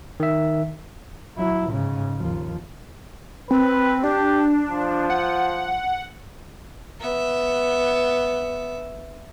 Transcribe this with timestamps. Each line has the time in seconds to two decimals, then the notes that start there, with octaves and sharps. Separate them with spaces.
0.20 D#3 E5
1.37 F#3 E4
1.70 G#2 C#3
2.18 D#2 F3
3.51 C4 B4
4.04 D4 G4
4.69 F3
5.10 F#5
7.00 B3 E5